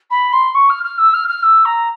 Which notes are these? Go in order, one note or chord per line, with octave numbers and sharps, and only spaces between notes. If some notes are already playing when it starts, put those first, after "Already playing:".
B5
C6
C#6
F6
F6
E6
F6
F6
E6
A#5